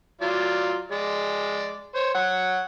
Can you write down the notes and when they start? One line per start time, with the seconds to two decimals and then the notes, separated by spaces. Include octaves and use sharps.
0.21 F#3 F4 D5
0.92 G#3 D5
1.95 C5 C#5
2.14 C#5 F#5